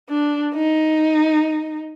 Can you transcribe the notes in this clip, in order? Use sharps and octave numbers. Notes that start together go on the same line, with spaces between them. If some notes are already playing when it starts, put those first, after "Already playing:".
D4
D#4